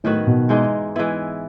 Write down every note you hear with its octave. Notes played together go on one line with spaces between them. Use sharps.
A2 D#3 F#3 B3 F#4
B2
G#2 E3 G#3 D#4
E3 G#3 B3 E4